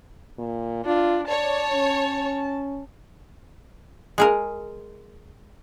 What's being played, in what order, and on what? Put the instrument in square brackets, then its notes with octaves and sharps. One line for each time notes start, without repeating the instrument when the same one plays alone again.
[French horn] A#2
[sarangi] D4 [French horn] F4
[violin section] C#5 [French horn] D5 [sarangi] A5
[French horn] C#4
[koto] G#3 G#4 A#4